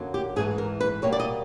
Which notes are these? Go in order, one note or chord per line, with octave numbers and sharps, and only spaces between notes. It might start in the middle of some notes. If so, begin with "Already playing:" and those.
Already playing: F#2 D3 F#3 A#3
G4
G#2 E3 A3 G#4
A#4
B4
B2 G3 A#3 C#5
D5
D#5